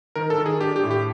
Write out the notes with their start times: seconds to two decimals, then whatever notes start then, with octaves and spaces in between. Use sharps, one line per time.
0.15 D#3 A#4
0.30 A4
0.38 D#3
0.46 G#4
0.61 D4 G4
0.76 G4
0.83 A2
0.91 G4